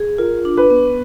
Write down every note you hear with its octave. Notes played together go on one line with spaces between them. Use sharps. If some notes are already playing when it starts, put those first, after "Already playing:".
Already playing: G#4
F4 A#4
D4
B4
B3